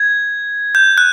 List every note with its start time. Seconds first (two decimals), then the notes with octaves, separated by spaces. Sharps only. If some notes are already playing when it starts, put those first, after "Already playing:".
Already playing: G#6
0.75 G6
0.98 F#6